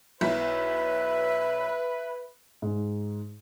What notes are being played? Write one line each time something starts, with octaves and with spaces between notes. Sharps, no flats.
B1 E4 B4 E5 B6
G#2